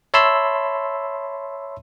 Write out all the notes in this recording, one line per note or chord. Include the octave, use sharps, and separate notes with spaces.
C#5 E5 A5 B5 C6 E6